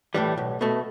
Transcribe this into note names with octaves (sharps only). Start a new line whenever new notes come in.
A2 E3 G3
B1
B2 A3